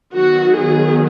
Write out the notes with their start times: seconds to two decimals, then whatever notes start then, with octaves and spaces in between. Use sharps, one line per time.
0.16 D#3 F#3 B3 F#4
0.56 G#4